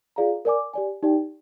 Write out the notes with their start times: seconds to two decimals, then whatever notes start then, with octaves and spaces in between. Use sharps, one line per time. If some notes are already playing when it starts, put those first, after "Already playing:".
0.16 F4 G#4 D5 F5 A#5
0.45 A#4 D5 G#5 D6
0.74 G4 D5 G#5
1.03 D#4 G4 D5 G5